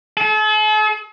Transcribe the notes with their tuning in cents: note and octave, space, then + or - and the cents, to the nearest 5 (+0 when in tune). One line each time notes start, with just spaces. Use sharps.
A4 -45